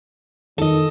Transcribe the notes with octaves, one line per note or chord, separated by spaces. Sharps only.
D#3 A4 D#5